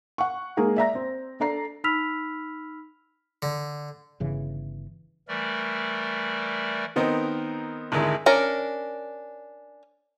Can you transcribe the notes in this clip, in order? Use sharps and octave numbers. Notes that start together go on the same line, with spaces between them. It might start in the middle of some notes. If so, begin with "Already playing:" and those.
F#5 C#6
G#3 A#3 D#4 G#4 A#4 F#5
D5 E5 A#5 A#6
C4
D4 A4 D5 A#5 C7
D#4 B5 E6 F6 B6 F7
D3
G1 C#3 E3
E3 G3 A3 A#4 D5
D#3 B3 C4 D#4 A#4
G#1 D2 G#3 E4 G#4 A#4
C#4 D4 A#4